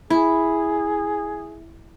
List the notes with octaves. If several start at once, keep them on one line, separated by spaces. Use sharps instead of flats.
E4 G#4